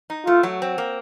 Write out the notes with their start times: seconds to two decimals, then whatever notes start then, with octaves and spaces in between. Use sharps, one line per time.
0.10 D#4
0.26 A3 F4
0.43 F#3
0.62 C4
0.78 A#3